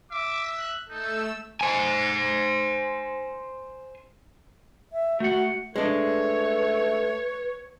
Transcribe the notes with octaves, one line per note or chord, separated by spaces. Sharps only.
E5 D6
F#6
A3 D#4 A4 E6
C5 G#5
E5
A3 F#4 F#5
G#3 A3 D4 B4 C#5